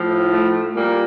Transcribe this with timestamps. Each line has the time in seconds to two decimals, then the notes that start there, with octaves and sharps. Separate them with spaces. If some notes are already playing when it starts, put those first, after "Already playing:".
Already playing: A2 F3
0.30 A3
0.74 A#2 G3 A#3